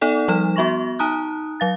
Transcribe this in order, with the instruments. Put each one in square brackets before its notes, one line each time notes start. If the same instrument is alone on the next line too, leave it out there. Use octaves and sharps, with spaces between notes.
[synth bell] B3 D#4 A4 D5 F#5
F3 G3 D#4 F6 E7
B3 F#4 E5 C6 C#6 A#6
D#4 A5 A#5 D#6 F#6
F#3 F5 A6